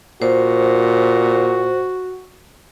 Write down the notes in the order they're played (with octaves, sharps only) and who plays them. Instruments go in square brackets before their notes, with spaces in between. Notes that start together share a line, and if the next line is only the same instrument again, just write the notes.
[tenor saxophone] A#2 [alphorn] F#4 [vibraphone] C5